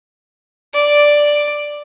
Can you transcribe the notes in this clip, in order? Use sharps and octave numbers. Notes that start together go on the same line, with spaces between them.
D5